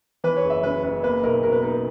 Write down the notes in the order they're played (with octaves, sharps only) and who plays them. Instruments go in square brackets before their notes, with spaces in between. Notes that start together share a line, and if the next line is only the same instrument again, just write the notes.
[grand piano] E3 B4
C#5
F#1
E5
F#2 B4
F#1 B4
A#3 B4
B1 A#4
B2 A#4
B4
D#4 A#4